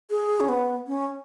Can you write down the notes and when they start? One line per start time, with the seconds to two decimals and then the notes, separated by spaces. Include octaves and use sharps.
0.10 G#4
0.40 C#4
0.49 B3
0.87 C#4